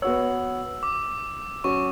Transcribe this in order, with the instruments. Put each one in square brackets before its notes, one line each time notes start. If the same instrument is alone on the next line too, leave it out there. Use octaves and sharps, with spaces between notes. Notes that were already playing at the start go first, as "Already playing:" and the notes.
[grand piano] B3 F#4 C#5 [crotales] E6
[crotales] D6
[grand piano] F#3 C#4 F#4 C#5 [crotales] C#6